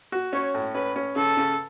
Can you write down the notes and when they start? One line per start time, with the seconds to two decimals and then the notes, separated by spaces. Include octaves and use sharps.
0.12 F#4
0.33 C#4 C#5
0.54 A2
0.74 C#4 B4
0.96 C#4
1.16 C#3 A4
1.37 C#3